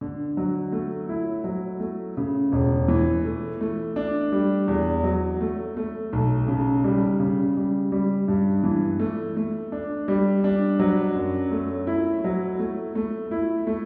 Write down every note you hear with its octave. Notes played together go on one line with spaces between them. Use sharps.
D3
F#3
A3
E4
F#3
A3
C#3
E1
E3
A3
A3
D4
G3
E2
F#3
A3
A3
B1
C#3
G3
C#3
G3
G3
G2
E3
A3
A3
D4
G3
D4
F#3
F#2
A3
E4
F#3
A3
A3
E4
A3